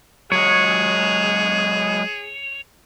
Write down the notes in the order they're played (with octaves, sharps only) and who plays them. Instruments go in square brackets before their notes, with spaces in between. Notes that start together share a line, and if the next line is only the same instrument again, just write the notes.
[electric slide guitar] F#3 G#3 [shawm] G#4 [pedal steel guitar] C#5